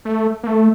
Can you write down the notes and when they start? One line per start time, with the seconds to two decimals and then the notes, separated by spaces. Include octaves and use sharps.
0.05 A3
0.44 A#3
0.47 A3